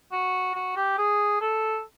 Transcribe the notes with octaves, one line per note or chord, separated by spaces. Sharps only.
F#4
F#4
G4
G#4
A4